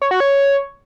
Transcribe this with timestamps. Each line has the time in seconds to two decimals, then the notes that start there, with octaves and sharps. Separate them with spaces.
0.02 C#5
0.11 F#4
0.20 C#5